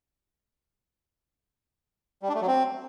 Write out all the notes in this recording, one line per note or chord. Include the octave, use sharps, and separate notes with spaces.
G3
D4
A3
F#3
C4